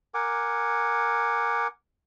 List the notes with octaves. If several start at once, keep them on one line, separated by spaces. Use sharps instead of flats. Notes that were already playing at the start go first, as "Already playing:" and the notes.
A#4 F#5 G#5 D6